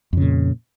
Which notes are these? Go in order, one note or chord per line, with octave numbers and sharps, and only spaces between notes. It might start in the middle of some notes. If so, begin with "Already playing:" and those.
F2 A#2 C#3